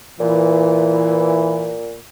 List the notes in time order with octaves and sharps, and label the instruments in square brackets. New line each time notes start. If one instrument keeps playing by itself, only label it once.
[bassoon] A#2 [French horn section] E3